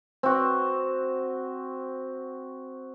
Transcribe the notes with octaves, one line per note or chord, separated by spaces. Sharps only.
C4 F#4